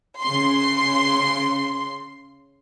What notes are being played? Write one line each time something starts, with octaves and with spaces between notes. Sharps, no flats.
C#3 C6